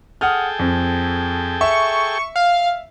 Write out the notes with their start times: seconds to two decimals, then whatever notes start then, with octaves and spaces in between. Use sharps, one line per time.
0.21 G#4 A4 F#5 G5 D#6 F6
0.59 F2
1.61 E5 C#6
2.36 F5